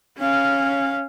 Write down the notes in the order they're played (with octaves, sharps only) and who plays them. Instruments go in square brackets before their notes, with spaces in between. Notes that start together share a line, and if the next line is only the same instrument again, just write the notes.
[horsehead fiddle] C#4 F5